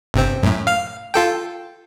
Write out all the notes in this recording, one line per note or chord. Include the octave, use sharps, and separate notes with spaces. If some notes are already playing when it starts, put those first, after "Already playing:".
G1 C3 C4
F#2 A2
F5 F6
F4 A4 G5